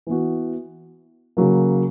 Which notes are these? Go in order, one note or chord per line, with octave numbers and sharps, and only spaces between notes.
E3 B3 F#4
C#3 F#3 A#3